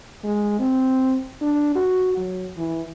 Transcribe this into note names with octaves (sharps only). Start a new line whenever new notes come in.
G#3
C4
D4
F#4
F#3
E3